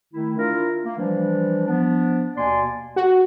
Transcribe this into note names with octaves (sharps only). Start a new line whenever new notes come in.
D#3 A3 E4
D4 E4 F4 A#4
A#3
E3 F3 G3 D4
F3 B3 D4
D#2 B2 A#3 D5 G#5 C6
F#4